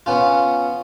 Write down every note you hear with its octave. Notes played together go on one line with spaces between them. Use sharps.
B3 C#4 F4